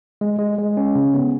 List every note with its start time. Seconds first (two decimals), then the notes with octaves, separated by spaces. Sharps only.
0.21 G#3
0.39 G#3
0.58 G#3
0.77 C#4
0.95 C#3
1.14 B3